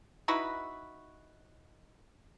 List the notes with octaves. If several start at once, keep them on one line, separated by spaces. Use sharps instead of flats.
D#4 E4 F#4 B4